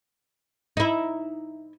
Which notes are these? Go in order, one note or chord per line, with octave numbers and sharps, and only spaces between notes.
D#4 E4